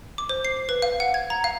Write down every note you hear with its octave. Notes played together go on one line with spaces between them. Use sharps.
D6
C5
C7
B4
F5
F#5
G#6
A#5
F5